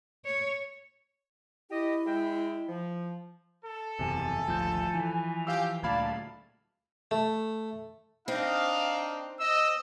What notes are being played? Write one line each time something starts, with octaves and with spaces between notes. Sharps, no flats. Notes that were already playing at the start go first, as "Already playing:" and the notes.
C#5
E4 G4 D#5
G#3 E5 G5
F3
A4
F#1 E2 C3 G#5
G#1 D2 F3 G6
E3
F3 G4 F5 E6
D2 A#2 D5 F5 A5 B5 G#6
A3
C4 D4 D#4 F5
D#5 E6